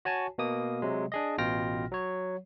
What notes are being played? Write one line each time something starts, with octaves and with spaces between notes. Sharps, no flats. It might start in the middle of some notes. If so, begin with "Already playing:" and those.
F#4 C#5 G#5 A5
B2 A#3 D#6
C3 F#3 G#3
D4 G#4 D#5
A1 B2 F4 G5 F6 A#6
F#3 C#5